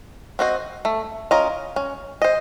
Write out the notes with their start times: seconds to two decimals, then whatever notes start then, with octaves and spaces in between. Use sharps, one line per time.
0.39 C4 F#4 C5 D#5
0.85 A3
1.31 C#4 F4 A#4 D#5
1.76 C#4
2.22 C5 D#5